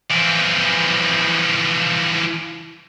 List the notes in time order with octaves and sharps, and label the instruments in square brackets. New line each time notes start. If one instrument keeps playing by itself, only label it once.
[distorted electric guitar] E3 F3